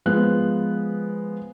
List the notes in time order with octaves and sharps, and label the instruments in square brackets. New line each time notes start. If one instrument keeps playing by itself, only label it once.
[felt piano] F3 G#3 B3 F#6